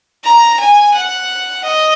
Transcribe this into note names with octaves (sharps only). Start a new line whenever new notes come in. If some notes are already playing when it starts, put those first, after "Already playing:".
A#5
G#5
F#5
D#5